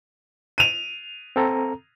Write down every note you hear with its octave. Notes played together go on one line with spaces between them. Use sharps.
D#7 F7
C4 A4 A#5